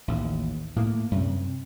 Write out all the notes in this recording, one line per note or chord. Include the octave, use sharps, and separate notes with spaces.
A1 D#2
A2 A#3
F#2 C3